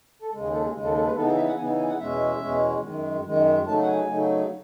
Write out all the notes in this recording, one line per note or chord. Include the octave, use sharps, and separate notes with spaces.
A4
D#2 C#3 G#3
G#4
A4
G#4
D#2 C#3 G#3
A4
A4
B4
C#3 E3 B3 D#4 A4
G#4
E5
F#5
C#3 E3 B3 D#4 G#5
G#5
F#5
E2 B2 G#3 C#4 E5
E2 B2 G#3 C#4
F#2 D#3 G#3
F#2 D#3 G#3
C#3 F#3 A3 D#4 A5
F#5
G#5
C#3 F#3 A3 D#4